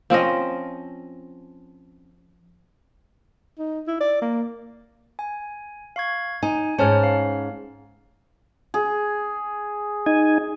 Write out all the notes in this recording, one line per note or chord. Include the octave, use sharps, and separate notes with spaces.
F3 C4 C#4 D#5
D#4
E4
D5
A#3
G#5
F5 C#6 G#6
D#4 G#5
G#2 C#4 C5 A5 F6
F5
G#4
D#4 G#5